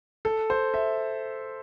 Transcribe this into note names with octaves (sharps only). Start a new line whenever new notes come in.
A4
C5
E5